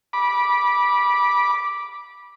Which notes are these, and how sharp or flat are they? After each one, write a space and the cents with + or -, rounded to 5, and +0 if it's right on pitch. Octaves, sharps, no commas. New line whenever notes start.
B5 -20 D6 +0